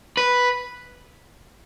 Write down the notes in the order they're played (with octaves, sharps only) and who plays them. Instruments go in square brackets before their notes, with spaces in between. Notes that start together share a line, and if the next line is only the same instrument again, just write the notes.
[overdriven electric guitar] B4